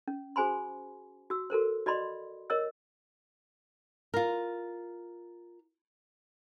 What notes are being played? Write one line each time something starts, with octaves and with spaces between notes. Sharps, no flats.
C#4
F#4 G#4 C5 G#5 B5 C6
F#4 E6
F#4 A4 A#4 C5
F#4 D5 D#5 B5 C6
A#4 C#5 D#5 E6
F4 A#4